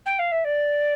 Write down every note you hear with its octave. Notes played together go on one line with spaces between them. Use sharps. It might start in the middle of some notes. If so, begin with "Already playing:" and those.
G5
F5
E5
D5